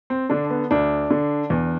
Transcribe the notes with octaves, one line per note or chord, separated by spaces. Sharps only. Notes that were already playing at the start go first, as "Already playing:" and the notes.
C4
D3 D4
B3
D2 D4
D3
E2